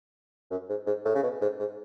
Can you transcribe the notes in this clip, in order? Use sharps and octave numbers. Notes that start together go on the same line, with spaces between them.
F#2
G#2
G#2
A2
C#3
B2
G#2
G#2